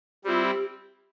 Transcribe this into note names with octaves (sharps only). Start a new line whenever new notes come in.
G3 C4 E4 F4 G4
G4